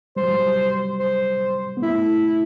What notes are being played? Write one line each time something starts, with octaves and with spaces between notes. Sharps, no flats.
G3 C5
F#3
G3
C5
B3
A3 E4